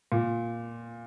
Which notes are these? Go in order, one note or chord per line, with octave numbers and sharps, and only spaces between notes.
A#2